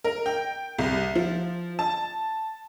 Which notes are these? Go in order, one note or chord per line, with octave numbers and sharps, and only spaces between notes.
A#4
G5
C2
F3
A5